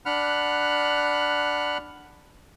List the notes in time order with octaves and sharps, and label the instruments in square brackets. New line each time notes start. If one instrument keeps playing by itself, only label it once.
[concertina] D4 F#5 B5 F6 F#6